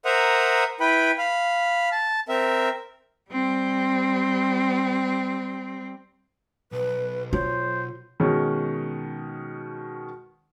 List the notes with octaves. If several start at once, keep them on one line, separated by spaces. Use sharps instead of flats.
A#4 C5 E5 F#5 A#5 D#6
E4 B4 G5 B5
F5 B5
A5
C4 A#4 E5
G3 C4
B1 B4
F4 C5 C#5
B2 D#3 G#3 C#4